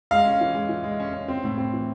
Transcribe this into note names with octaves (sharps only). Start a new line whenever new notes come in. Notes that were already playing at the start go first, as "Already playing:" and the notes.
G#3 F5
C#4
E3
G#3
E3
G#3
C#4
C#4
C4
A2
C4
E3